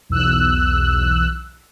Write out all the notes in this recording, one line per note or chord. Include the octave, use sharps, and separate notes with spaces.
B1 E2 E6 F#6